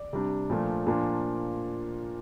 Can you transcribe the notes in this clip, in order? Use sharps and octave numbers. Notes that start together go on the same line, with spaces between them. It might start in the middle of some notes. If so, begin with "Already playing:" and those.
Already playing: D5
C3 G3 D4
A#2 F3 A3 D4
A#2 F3 A#3 D4